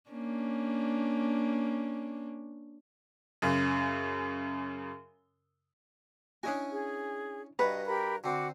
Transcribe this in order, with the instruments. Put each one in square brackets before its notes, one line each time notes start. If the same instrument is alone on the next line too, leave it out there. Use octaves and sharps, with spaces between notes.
[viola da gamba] A#3 C#4 D4
[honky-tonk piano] F#2 C#3
[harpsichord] C#4 D#5 G#5 [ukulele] D4 E4 F#4
[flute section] G#4
[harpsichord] G2 F#4 A#5 [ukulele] B4 [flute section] D#5
[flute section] G4 A#4 B5
[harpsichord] D3 C4 [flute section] F#4 D6